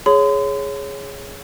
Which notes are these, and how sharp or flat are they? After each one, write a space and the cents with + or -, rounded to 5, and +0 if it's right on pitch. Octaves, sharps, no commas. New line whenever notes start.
G#4 +0 C#5 +0 C6 -40